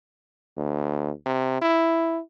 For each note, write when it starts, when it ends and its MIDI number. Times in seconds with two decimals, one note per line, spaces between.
0.57 1.10 38
1.26 1.58 48
1.61 2.19 64